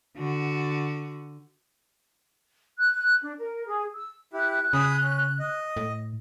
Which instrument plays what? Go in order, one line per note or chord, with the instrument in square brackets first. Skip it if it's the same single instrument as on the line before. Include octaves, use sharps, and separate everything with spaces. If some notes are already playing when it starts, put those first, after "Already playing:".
[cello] D3 F#4
[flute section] F#6
D4
A#4
G#4
E6
[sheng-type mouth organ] E4 G4 [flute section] F#6
[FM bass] C#3 [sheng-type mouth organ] G#4 B5 D#6
[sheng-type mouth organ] C#4
D#5
[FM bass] A2